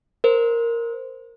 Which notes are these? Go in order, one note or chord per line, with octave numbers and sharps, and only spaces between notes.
A#4 C5